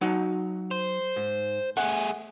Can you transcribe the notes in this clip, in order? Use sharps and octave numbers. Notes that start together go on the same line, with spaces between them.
F#3 D#4 F#5
C5
G#2
A3 G#4 F#5